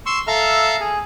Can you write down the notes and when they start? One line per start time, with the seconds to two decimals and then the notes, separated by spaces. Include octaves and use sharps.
0.06 C6 C#6 E6
0.27 A4 E5 F5 A#5 F6
0.80 G#4